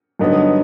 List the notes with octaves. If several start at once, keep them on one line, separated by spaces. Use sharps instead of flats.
G2 D3 F#3 B3 D#4